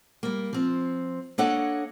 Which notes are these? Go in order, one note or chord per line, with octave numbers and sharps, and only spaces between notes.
G3 A#3
F3 C4
A#3 D4 A4 C#5 D#5 F#5